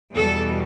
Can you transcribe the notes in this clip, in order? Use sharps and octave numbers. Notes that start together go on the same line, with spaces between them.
E2 B2 G3 A4